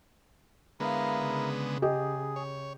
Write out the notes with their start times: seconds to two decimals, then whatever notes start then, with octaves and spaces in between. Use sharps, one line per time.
0.80 D3 G#3 B3 E4 A#4 F5
1.19 C#3
1.82 G4 G#4 D#5
2.36 C#5